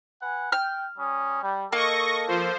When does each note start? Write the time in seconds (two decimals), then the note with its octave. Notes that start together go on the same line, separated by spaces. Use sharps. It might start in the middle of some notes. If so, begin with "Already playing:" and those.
0.22 B4 F#5 G#5
0.52 G5 F6
0.98 G3 C#4 D#6
1.42 G3
1.73 A#3 A4 D#5 C#6 A#6
2.28 F3 C5